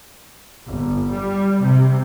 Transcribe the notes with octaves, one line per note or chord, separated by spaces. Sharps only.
G1
G3
C3